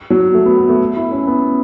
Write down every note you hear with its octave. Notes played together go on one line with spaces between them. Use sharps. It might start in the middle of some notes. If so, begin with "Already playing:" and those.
F#3
A3
B3
B3
A3
E4
C#4
B3